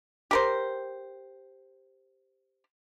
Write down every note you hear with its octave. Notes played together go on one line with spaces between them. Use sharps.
G4 A#4 C5